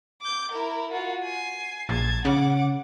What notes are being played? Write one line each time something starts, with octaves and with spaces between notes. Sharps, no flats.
D6 G6
E4 A#4
F4 F#4
G#5 C7
A#1 A5 G#6
C#3 F#5 D6